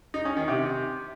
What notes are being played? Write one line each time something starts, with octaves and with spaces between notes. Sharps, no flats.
D#4
C#4
D#3
C3